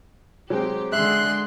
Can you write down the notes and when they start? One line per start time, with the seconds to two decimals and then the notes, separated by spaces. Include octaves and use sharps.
0.50 F#3 G#3 C4 G4
0.92 D3 G#3 E5 C6 F#6